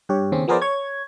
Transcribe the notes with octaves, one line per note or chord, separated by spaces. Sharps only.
G2 G4 C#5
D#2 C#3 C4 C#4
F3 B3 G#4 A#4 C5 D5
C#5 G#6